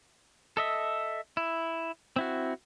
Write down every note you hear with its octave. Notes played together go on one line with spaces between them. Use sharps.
A4 D#5 E5
E4
C4 E4 F#4